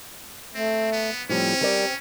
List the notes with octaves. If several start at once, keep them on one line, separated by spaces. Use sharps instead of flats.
A3 C4
B3
A2 F3 G3 C4 C#4
G3 A#4 D5